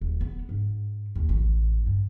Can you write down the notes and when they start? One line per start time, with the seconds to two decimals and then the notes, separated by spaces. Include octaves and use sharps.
0.01 D#1
0.21 B3
0.49 G#2
1.15 D#2
1.29 A1
1.86 G2